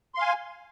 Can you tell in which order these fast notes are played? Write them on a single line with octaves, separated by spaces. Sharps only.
C6 F5 G#5